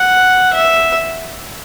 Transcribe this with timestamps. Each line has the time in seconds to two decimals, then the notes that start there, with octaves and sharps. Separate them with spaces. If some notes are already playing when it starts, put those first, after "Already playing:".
Already playing: F#5
0.54 E5